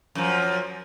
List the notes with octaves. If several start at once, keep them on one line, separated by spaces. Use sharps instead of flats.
F#2 F3